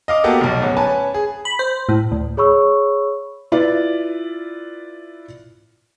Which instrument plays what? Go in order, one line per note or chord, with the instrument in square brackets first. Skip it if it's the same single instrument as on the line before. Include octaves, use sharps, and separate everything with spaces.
[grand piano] D#5 F5 D6
A#3 B3 F#4 G4 A4
F1 B1
D1 B3 C#4
C#4 B4 G#5 A5
G#4
[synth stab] B5
C5
A2
D2
[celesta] G#4 C#5 B5 C#6 E6
[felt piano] E4 F4 B4 D5